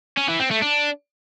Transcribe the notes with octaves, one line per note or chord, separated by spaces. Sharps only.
C#4
E3
C4
A3
D4